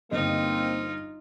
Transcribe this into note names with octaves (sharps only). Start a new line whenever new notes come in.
G1 G2 A#3 C4 D#4 F4 D#5